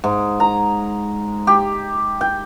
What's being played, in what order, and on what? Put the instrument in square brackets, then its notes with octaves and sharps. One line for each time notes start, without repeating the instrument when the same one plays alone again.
[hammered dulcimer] G#2
A#5
G4
G5